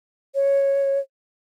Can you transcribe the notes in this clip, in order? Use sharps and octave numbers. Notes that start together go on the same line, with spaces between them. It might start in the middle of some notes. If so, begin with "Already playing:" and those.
C#5